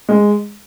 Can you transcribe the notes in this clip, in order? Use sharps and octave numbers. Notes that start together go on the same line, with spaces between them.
G#3